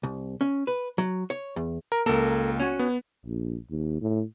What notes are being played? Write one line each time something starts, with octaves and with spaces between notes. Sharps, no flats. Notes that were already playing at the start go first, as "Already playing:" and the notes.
C2
C#4
B4
F#3
C#5
E2
A#4
C#2 A#3 A4 A#4
C#4 F#4
B3
A#1
D#2
A2